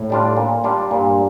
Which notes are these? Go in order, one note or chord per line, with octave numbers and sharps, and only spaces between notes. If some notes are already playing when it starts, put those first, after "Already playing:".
Already playing: A2
G3 D4 F4
A#2
G3 D4 F4
G2 A#2